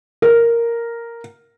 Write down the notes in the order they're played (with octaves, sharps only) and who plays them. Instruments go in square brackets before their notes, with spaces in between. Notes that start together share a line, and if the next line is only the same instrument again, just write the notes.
[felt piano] A#4